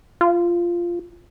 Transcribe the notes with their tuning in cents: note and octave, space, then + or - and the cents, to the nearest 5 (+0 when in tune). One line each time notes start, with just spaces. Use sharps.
F4 -10